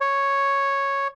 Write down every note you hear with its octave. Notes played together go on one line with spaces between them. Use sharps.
C#5